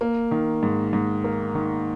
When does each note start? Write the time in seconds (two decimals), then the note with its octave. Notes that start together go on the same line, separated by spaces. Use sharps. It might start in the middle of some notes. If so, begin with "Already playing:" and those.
0.01 A#3
0.31 D#3
0.63 G#2
0.93 G#2
1.24 A#3
1.55 D#3